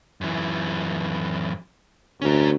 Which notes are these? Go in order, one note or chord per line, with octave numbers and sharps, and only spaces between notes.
F#2 E3
D2 C#4 A#4